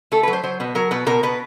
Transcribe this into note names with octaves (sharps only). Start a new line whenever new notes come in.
A3 A4
F#3 B4
C5
F#3 C5
B2 B4
F#3 A#4
B2 B4
B2 A#4
B2 B4